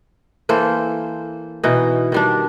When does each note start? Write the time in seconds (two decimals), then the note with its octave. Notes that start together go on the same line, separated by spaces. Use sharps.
0.49 E3 A#3 A4 C5
1.64 B2 E3 D#4
2.12 D#3 G3 D4